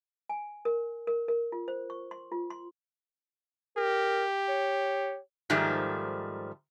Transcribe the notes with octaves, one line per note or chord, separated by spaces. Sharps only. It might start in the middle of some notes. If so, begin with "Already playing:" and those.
G#5
A#4
A#4
A#4
F4
C5
C#6
C6
F4
C6
G4 A#4
C#5
G#2 D#3 F3 G3 A3